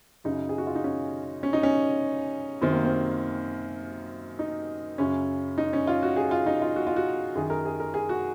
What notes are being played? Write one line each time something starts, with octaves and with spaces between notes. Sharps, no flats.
F#2 C#3 D#4
G#4
F#4
F4
D#4
C#4
C#4
D#4
C#4
F#2 D#3 C4
A#3
C4
D#4
F#2 C#3 C#4
D#4
C#4
F4
F#4
G#4
F4
D#4
F4
F#4
F4
F#4
F#2 D#3 G#4
A#4
G#4
A#4
G#4
F#4